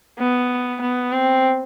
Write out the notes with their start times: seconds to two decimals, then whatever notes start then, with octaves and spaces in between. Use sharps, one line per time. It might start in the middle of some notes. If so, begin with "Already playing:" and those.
0.19 B3
0.81 B3
1.12 C4